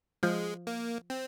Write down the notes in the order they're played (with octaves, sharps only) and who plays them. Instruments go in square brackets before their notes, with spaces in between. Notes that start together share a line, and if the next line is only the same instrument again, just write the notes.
[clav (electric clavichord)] F3 [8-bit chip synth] G#3
[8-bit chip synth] A#3
C4